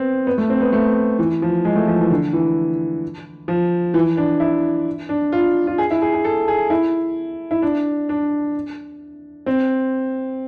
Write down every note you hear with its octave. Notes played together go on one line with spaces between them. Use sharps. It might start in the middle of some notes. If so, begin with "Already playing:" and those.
Already playing: B3 C4
B3
A3
C4
B3
A3
E3
F3
G#3
A3
F3
E3
D3
E3
F3
E3
D4
E4
D4
F4
F4
G#4
E4
G#4
G#4
A4
G#4
E4
E4
D4
D4
C4